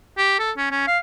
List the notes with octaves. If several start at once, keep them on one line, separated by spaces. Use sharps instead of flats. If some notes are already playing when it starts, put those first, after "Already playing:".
G4
A4
C#4
C#4
F5